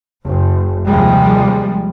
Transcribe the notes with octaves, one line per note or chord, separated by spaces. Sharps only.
F#1
D#2 C3 F3 G3 G#3